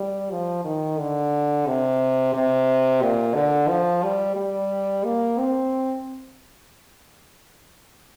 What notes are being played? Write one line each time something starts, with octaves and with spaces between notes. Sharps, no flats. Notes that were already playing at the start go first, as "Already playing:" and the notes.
Already playing: G3
F3
D#3
D3
C3
C3
A#2
D3
F3
G3
G3
A#3
C4